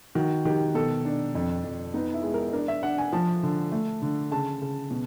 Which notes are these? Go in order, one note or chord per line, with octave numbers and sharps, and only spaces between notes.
D#3 F#4
D#3 G4
B2 A4
D4
F2
F2
B3 D#4
E4
G#3
A#4
D4 A#4
E5
D4 F#5
G#5
F3 A5
D3
A3
D3
C#3 A5
C#3
B2